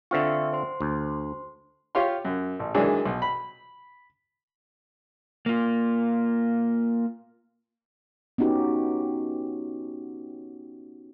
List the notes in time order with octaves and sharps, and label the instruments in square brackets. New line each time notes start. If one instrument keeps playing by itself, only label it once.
[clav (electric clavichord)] D3 C4 F4 [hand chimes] E5 C#6
[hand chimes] C5 C6
[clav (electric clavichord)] D2
[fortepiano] F4 G4 C#5 F5 C6
F#2
A1
D#3 E3 F#3 G#3 D4
B1
B5
[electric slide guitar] A#3 F4
[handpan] B3 C#4 D#4 F#4 G4